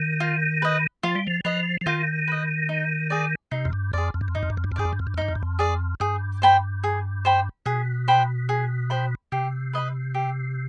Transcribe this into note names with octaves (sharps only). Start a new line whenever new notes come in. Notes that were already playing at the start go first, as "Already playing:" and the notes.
Already playing: D#3
F4
B4 D#5
F3 F4
G3
F3
F3 B4 D#5
F3
D#3 F4
B4 D#5
D#4
G#4 D5
C3 D#4
F2
G2
F2 G#4 D5
F2
G2
F2
G2 D#4
F2
G2
F2
G2
F2
G2 G#4 D5
F2
G2
F2
G2
F2
G2 D#4
F2
G2
F2
G#4 D5
G2 G#4
C5 G5 B5
G#4
C5 G5 B5
B2 G#4
C5 G5 B5
G#4
C5 G5 B5
C3 G4
B4 D#5 B5
G4